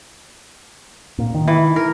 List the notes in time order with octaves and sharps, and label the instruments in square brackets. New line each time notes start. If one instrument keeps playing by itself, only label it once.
[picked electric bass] A#2
D#3
[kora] E3
A#4